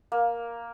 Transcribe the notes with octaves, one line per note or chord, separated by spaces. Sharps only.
A#3